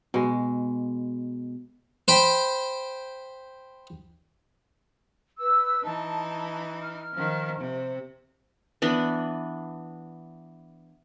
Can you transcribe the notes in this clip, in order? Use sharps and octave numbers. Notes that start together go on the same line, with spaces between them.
B2 G#3
C5 G5 B5
B4 E6
E3 D#4 A5
F6
D#3 F3
C3
E3 B3 D4 B5